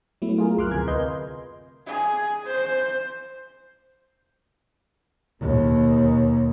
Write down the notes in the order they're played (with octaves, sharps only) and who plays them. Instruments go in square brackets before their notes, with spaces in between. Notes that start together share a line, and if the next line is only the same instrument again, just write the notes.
[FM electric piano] F#3 A3 B3 E4
F4 G#4 A#4
C2 F#2 C6 D6 F6 F#6
D2 C3 G#4 A#4 G#6
B4 D#5 F5 C6 G6
[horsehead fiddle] G#4
C5
[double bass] D#2 B2